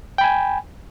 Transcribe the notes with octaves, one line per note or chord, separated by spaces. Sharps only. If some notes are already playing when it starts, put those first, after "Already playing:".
G5 G#5 B5